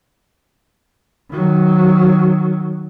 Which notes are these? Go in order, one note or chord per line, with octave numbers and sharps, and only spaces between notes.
D#3 F#3